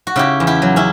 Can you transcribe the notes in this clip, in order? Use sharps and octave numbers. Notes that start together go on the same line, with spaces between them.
F#4
C#3 E4 G4
E2
E4 G4
F#3
C#4 E4